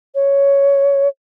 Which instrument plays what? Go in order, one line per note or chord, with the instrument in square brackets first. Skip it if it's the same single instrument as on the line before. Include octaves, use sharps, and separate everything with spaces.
[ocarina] C#5